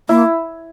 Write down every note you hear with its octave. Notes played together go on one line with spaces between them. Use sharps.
A#3 E4